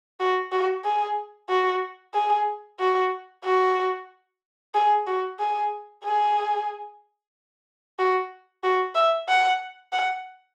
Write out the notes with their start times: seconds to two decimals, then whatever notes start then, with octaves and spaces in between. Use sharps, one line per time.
0.20 F#4
0.52 F#4
0.84 G#4
1.49 F#4
2.14 G#4
2.80 F#4
3.44 F#4
4.74 G#4
5.07 F#4
5.39 G#4
6.04 G#4
7.99 F#4
8.63 F#4
8.95 E5
9.29 F#5
9.92 F#5